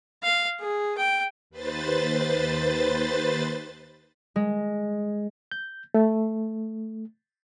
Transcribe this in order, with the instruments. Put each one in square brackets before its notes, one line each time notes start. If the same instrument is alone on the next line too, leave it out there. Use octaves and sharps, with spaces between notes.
[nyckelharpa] F5
G#4
G5
[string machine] D#2 B4 C5 A6
[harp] G#3
[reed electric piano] G6
A3